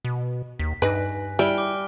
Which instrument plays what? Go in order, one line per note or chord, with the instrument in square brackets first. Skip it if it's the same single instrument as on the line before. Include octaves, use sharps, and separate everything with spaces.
[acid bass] B2
[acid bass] D#2 [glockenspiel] B6
[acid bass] G2 [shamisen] D#4 B4 [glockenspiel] G#5 F#6 A#6
[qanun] G3 [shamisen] E4 [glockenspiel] F6 D7 G7
[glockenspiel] D6